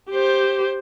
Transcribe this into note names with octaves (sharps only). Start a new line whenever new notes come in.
G4 C5